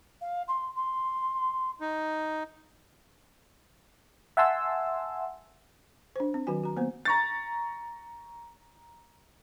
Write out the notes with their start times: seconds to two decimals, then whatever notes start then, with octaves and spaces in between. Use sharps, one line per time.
0.21 F5
0.48 C6
0.75 C6
1.80 D#4
4.37 E5 F#5 G#5 A5 C6 E6
6.16 D4 C5
6.34 C4
6.47 D#3 F#3 F#4 G#5
6.64 F#4 A#5
6.77 A#3 B3 C5
7.05 A#5 C#6 A6